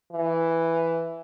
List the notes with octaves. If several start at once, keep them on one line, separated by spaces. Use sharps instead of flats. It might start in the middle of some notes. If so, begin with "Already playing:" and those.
E3